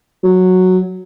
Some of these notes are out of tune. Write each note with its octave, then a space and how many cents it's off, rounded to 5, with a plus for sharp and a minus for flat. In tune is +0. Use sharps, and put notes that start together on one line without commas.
F#3 -5